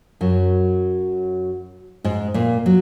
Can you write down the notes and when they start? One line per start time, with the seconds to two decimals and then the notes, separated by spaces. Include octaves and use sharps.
0.21 F#2 F#3
2.04 G#2 G#3
2.34 A#2 A#3
2.66 F#3